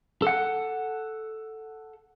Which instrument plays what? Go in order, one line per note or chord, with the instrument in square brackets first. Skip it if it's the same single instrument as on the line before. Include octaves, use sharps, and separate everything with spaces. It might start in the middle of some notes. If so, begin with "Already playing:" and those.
[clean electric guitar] A4 F#5